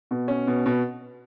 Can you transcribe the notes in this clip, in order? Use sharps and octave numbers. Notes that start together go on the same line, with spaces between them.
B2
C#4
B2
B2